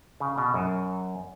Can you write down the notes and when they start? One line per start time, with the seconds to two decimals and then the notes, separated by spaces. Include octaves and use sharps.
0.20 C#3
0.38 B2
0.54 F#2